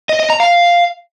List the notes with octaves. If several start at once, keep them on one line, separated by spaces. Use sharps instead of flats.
D#5
D#5
A#5
F5